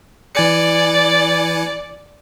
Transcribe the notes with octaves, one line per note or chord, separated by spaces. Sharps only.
E3 D5 G#5 C#7